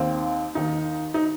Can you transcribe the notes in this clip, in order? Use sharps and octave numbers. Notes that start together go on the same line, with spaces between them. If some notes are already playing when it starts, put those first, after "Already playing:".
Already playing: D#2 D#3 C4
D#2 D#3 D#4
D#4